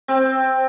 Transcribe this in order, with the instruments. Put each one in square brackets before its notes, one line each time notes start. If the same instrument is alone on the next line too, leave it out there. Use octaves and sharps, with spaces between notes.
[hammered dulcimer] C4